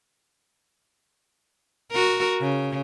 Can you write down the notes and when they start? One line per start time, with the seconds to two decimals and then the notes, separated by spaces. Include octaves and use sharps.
1.92 F#4 A#4
2.41 C#3